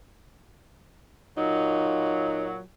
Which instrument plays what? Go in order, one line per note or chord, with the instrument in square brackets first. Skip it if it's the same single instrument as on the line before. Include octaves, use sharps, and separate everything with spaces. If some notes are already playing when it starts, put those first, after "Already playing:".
[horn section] A#2 F#3 [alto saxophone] D#4